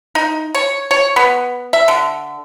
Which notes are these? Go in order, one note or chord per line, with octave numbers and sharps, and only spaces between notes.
D#4
C#5
C#5
B3
E5
D3